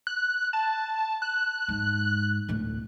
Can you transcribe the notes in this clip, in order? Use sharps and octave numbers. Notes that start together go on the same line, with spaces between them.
F#6
A5
F#6
G#2
D1 A2